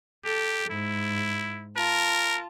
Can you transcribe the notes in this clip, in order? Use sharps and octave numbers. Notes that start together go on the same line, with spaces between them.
G4 A4
G#2 E4
F4 A#4 A5